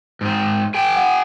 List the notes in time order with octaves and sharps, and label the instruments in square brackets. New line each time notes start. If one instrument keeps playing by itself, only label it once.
[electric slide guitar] G#2 C4
G#4 G5
[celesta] F#5